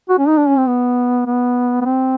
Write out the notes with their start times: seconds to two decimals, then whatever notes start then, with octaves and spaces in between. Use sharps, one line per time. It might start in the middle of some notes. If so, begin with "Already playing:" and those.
0.09 F#4
0.18 C#4
0.28 D#4
0.37 D4
0.48 C#4
0.58 C4
0.67 B3
1.26 B3
1.81 B3
1.85 C4